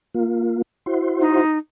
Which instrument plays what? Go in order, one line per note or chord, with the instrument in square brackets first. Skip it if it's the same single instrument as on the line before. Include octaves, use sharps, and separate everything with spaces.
[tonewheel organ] A#3 F4
E4 F#4 C5
[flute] D#4